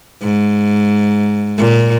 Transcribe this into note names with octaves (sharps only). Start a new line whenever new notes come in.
G#2
A#2